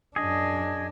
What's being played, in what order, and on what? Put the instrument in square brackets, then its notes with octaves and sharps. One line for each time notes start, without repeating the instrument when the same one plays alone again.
[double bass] F#2 D4 [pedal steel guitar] G#4 D#5